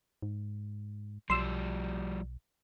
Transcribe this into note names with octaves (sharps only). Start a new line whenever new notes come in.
G#2
B1 F3 G3 C6 E6